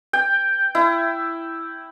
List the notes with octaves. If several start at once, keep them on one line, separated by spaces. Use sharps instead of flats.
G5
E4